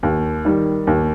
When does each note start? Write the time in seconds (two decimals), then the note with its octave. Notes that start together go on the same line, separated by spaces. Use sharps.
0.03 D#2
0.45 D#3 G3
0.87 D#2